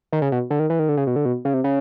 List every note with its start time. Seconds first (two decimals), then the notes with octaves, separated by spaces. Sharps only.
0.13 D#3
0.22 C#3
0.32 B2
0.51 D3
0.59 D#3
0.70 E3
0.79 D#3
0.89 D3
0.97 C#3
1.07 B2
1.16 D3
1.25 B2
1.45 C#3
1.54 C3
1.64 C#3